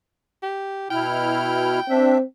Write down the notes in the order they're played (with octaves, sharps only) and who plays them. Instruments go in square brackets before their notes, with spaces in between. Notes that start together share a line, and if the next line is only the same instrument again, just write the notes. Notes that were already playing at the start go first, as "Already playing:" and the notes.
[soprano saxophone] G4
[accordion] B2 E4 F6 [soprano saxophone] G5
[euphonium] C4 [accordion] D4 E5